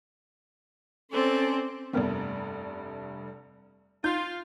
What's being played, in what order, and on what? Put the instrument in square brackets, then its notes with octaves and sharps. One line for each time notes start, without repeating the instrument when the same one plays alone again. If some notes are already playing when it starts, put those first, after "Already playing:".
[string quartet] C4 C5 D5 [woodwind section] C#4 A4
[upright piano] F1 G2 A3 [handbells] B3 C4 A#4
[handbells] D#4 [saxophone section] F4 [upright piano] G6